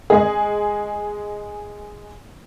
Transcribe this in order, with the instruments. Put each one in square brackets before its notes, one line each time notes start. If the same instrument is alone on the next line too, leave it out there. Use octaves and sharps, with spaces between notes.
[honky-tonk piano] G#3 G#4